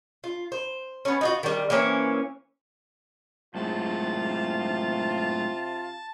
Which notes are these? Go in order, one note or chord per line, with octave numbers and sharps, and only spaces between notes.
F4
C5
B3 C#4
D#4 F4 F#4
D#3 G3
E3 A#3 C4 C#4
F#2 A2 C3 G#3 F4 A5